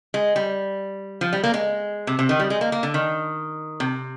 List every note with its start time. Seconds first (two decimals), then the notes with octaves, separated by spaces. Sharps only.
0.14 G#3
0.36 G3
1.21 F3
1.33 G3
1.44 A#3
1.54 G#3
2.07 C3
2.19 C3
2.29 D#3
2.40 G3
2.50 G#3
2.61 A#3
2.72 A#3
2.83 D3
2.94 D#3
3.80 C3